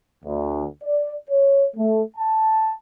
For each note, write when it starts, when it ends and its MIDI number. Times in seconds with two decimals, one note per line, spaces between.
0.25 0.64 38
0.84 1.14 74
1.30 1.65 73
1.76 2.02 57
2.17 2.74 81